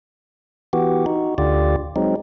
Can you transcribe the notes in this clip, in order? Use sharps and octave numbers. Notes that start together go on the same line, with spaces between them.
E3 B3 F#4 G4
D#4 F#4
D2 D3 F4 G4 D5
F#3 G#3 C4 D#4